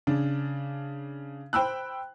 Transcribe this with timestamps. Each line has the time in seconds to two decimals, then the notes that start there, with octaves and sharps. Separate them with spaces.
0.07 C#3 D4
1.53 C5 G5 B5 E6 F#6